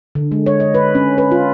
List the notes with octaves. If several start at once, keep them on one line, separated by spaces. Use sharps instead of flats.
D3
G#3
C#5
D#5
B4
C#4
B4
F4